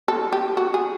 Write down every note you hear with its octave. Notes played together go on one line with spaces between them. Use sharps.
A4
G4
F#4
G#4